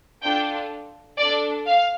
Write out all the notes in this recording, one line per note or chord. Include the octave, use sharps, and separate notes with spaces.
D4 F4 A4 G5
D4 A4 D5
F5